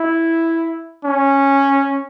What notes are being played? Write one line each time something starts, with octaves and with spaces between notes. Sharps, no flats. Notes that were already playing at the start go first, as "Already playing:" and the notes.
Already playing: E4
C#4